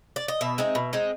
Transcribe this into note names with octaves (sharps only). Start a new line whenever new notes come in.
D5
D#5
B2 E5
G#3 C4 D#4
B2
G#3 C4 D#4